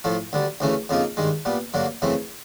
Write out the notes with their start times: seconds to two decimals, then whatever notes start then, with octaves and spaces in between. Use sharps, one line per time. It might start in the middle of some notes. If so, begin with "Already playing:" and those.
0.04 A2 F3 A3
0.33 D2 D3 G3
0.60 D2 C#3 E3 A3 C#4
0.89 F2 C#3 F3 A#3 D#4
1.17 G2 D#3 G#3
1.45 A#2 G3 B3
1.74 G2 D3 F#3 A#3
2.02 F#2 C#3 E3 A3 C4